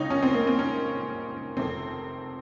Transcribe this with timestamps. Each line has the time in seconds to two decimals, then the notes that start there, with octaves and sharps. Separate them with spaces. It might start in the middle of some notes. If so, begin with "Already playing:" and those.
Already playing: C#2 C#3 D#4 C#5
0.10 C#4
0.23 C4
0.34 A#3
0.47 C4
0.59 C#4
1.57 F1 F2 C3 D#3 C4